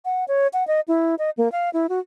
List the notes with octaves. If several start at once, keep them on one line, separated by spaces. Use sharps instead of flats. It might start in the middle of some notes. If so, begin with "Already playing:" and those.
F#5
C#5
F#5
D#5
E4
D#5
A#3
F5
E4
F#4